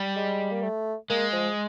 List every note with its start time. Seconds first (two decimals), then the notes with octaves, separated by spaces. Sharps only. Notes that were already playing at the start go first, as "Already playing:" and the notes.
Already playing: G3
0.16 G#3
0.51 A#3
0.63 A3
1.10 G#3 A#3
1.33 F3